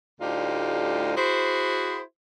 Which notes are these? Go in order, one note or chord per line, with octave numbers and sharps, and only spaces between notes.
D2 A2 G3 D#4 F4 G4
E4 F#4 G#4 C5